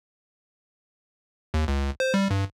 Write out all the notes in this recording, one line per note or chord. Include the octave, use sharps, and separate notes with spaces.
D#2
C#2
C5
G3
G2